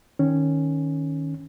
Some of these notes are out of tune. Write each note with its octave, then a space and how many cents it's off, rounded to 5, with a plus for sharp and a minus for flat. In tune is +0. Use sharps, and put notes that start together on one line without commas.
D#3 +0 C#4 -5